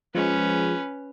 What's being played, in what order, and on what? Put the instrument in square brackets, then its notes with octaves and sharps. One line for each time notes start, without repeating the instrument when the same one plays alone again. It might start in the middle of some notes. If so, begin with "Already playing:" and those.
[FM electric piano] F3 G#3 [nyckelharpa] C#4 B4